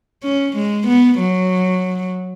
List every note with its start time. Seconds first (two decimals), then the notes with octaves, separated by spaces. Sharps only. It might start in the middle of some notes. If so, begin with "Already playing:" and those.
0.23 C#4
0.56 G#3
0.87 B3
1.19 F#3